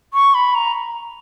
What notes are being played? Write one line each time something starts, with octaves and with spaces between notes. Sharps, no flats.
C#6
B5
A#5